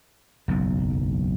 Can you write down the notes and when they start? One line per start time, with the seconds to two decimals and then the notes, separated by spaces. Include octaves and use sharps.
0.48 F#1 B1 E2